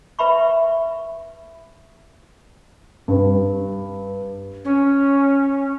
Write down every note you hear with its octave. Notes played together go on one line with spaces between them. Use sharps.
B4 E5 B5 C#6
G2
C#4